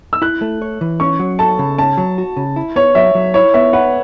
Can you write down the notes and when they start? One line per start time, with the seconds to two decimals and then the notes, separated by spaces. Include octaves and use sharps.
0.13 E6
0.22 E4 F#6
0.42 A3
0.62 C#5
0.81 E3
1.00 C#4 C#6
1.19 F#3
1.39 A4 A5
1.59 C#3
1.78 C#4 A5
1.98 F#3
2.18 F#4
2.37 C#3
2.56 E4
2.76 B3 C#5
2.95 F#3 E5
3.15 F#3
3.34 E4 C#5
3.54 B3 E5
3.73 B4 F#5